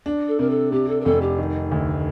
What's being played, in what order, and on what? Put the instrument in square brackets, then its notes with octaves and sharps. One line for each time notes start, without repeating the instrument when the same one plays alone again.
[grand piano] D4
[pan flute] A4
[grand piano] C3 [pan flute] A#4
[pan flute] A4
[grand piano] C3 [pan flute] G4
[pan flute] A4
A#4
[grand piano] F1 [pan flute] A4
[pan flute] G4
[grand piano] D#3
D2